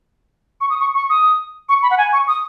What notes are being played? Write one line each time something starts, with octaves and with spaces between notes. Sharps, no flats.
C#6
D#6
C#6
C#6
D#6
C#6
B5
F#5
G#5
C#6
D#6